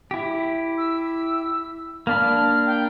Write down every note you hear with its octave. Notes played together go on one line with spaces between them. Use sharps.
E4 G4
E6
A#3 D4 B5 F6
G5